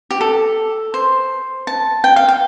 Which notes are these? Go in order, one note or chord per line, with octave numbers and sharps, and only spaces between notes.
G4
A4
C5
A5
G5
F5
G5